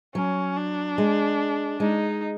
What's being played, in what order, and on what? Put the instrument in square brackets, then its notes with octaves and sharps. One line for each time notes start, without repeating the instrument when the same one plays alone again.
[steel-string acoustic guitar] F#3 [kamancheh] C#4
[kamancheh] D4
[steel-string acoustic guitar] G#3
[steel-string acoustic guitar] G#3 [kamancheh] D#4